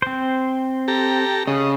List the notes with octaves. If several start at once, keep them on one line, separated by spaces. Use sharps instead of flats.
C4 C5
G4 A4 A#5
C#3 D#5